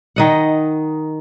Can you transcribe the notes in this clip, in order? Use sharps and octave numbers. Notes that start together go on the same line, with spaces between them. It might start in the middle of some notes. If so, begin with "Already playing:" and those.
D#3 D#5 F#5